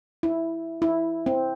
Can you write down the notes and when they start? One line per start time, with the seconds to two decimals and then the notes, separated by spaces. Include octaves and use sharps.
0.23 E4
0.82 E4
1.26 C4